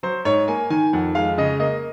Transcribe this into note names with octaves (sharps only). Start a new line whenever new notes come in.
F#3 C5
G#2 C#5
A#3 G#5
D#3 G#5
F2 F#5
G#3 F5
C#3 D#5
A#3 D#5